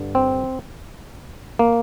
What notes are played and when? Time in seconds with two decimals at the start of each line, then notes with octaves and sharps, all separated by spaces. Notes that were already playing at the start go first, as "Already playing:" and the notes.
Already playing: G2 D3
0.15 C4
1.59 A#3